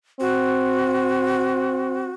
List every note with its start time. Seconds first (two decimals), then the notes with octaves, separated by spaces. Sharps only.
0.20 C4 F#4